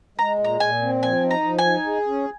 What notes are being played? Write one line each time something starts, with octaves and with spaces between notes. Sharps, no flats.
G#3 A#5
A#2
A#5
A#2 G#5
C4
F3 G#5
D#4
A#5
F3
G#5
D#4
G#4
C#4